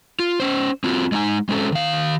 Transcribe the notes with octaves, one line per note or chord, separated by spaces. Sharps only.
F4
C#4 C5
C4 F4 F#4
G#3 D4 D#4 G#5
G#3 C4 C#4 A4
D#3 F5